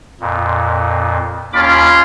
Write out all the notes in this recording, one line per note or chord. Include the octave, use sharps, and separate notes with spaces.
F2 A#2
D#2 C#4 F4 B5 D6